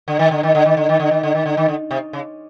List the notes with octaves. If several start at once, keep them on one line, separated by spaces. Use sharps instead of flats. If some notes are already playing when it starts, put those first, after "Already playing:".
D3
D#3
D3
D#3
D3
D#3
D3
D#3
D3
D#3
D3
D#3
D3
D#3
D3
C3
C#3